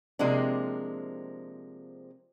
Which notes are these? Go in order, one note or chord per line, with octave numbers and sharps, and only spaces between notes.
C3 F3 G#3 A#3 C4 D4